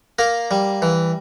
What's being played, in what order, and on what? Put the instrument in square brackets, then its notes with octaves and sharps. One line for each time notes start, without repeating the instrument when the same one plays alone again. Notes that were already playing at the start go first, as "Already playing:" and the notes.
[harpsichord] A#3 A#4
G3
E3